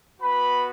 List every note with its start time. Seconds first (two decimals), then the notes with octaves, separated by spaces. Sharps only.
0.21 B3 F#4 B4 B5